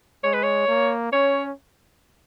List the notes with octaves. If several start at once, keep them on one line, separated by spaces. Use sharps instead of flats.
G#3 C#5
B4
C#5
A#3
C#4 C#5